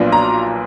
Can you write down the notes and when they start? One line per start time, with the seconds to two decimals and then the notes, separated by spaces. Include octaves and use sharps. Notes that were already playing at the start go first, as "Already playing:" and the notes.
Already playing: B1 A#2 F3 B3 D4
0.12 A#5